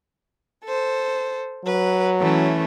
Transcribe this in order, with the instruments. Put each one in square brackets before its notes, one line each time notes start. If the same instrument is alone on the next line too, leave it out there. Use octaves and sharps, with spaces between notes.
[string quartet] A4 C5
[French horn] F#3 [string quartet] B4
[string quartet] E3 A3 C#4